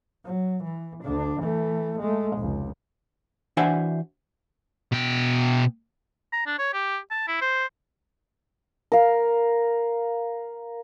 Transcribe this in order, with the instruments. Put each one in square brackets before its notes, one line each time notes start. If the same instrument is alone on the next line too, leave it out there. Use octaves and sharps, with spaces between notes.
[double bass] F#3
E3
D2 D4
E3 A3
G#3 A3
F1 C#2
[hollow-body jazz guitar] E3 D4 F#4 C5 E5 G#5
[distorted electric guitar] B2 G5
[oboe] A#5
D4
C#5
G4
A5
E4
C5
[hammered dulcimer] A#4 F5